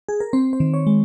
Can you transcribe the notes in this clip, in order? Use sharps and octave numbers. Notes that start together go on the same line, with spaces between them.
G#4
A#4
C4 C5
C5
D#3
C#5
G#3